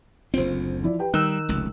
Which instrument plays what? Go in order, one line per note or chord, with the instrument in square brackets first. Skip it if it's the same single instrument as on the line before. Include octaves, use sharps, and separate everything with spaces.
[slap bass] F#1 D2 C4 [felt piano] F4 C5
[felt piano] F3 E4 D5
G4 B4 G5
[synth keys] D#3 E6 [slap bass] G3 [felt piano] F#6
[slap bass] F1 C#2